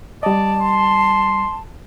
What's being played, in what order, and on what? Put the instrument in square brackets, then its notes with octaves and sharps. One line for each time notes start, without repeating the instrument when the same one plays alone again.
[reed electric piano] G3 D#5 [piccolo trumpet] D5 [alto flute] A5
[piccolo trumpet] C6